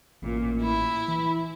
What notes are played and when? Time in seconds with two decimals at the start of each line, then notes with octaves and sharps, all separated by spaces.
0.22 A1 A#2
0.60 E4
1.08 E3